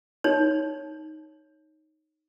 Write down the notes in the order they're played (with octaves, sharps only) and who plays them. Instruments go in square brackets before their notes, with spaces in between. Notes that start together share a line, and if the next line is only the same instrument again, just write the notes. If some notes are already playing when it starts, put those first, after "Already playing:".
[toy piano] D#4 C#5